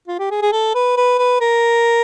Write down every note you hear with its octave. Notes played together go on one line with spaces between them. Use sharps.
F4
G4
G#4
G#4
A4
B4
B4
B4
A#4